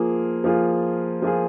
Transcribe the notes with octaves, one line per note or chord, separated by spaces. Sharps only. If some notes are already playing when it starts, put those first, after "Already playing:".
Already playing: F3 A#3 F4 G#4
F3 A#3 F4 G#4
F3 A#3 F4 G#4